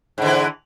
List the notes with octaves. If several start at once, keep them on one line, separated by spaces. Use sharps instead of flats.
G#2 D3 E3